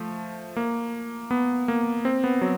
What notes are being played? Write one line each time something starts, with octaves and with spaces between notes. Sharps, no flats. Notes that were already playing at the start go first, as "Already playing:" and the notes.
Already playing: F3 A3
A#3
B3
A#3
C4
B3
F#3